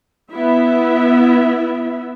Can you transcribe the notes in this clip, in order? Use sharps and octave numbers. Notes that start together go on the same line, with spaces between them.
B3 E4 E5